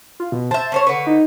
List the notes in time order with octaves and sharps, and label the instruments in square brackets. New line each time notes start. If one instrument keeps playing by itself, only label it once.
[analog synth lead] F4
B2
[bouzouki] C5 E5 [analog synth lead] A5
[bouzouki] C#4 C5 C#5
[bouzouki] D3 B4 [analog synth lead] C#6
[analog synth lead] D#4